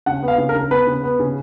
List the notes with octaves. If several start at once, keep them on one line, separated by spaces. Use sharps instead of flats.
C#3 F#5
B3
F5
C#3
A#4
C#3
B3 B4
C#3
B3
C#3